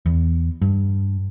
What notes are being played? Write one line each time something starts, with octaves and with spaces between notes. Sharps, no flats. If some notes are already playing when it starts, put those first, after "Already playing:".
E2
G2